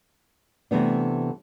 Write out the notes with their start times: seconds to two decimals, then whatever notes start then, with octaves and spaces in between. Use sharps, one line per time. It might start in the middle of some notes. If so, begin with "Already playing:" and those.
0.71 C3 E3 A3 B3 D4